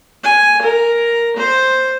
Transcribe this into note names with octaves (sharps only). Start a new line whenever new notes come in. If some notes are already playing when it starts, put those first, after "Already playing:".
G#5
A#4
C5